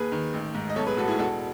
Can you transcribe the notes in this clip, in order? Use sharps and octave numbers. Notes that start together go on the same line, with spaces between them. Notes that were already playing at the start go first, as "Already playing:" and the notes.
Already playing: D#2 G#4 B4
D#3
A1
G#2
D#5
B1 A4 C#5
G#4 B4
A2 F#4 A4
E4 G#4
E1 F#4 A4